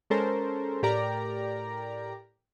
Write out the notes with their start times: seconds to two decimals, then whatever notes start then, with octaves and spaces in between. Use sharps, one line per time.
0.10 G#3 C#4 A4 A#4 C5
0.83 A2 G4 A#4 D5 A#5